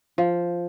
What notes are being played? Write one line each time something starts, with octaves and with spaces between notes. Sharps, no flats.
F3